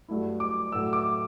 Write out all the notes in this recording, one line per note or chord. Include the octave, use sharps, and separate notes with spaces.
G2 F#3 A3 E4
D6
A2 F#3 A3 E6
D6